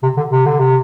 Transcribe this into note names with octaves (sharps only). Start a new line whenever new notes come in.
C3
D3
C3
D3
C3